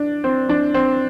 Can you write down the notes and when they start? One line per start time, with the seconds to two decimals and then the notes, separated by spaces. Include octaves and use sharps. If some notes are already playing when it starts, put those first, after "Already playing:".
Already playing: D4
0.24 C4
0.49 D4
0.74 C4